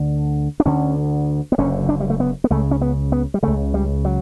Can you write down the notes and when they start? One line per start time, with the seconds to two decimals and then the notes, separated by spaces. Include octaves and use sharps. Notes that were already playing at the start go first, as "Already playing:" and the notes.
Already playing: D2 D3
0.60 D4
0.65 D2 D3 C#4
1.52 B3
1.58 F#1 F#2 D3 C#4
1.89 D4
2.00 G3
2.10 A3
2.20 B3
2.44 B3
2.50 C#2 C#3 A3
2.71 C#4
2.81 B3
3.12 B3
3.34 G3
3.43 C#2 C#3 A3
3.74 G3
4.05 F#3